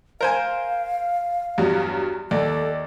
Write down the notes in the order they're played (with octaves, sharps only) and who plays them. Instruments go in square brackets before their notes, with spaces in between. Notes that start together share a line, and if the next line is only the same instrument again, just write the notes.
[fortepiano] A#4 C5 G#5 [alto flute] F5
[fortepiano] E2 [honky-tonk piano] G2 F#3 G3
[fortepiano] D#2 [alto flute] A4 [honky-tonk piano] D5